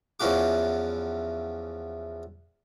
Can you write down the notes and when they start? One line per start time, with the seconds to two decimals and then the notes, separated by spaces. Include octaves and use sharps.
0.20 E2 E3 F3 C#4 F#4 D6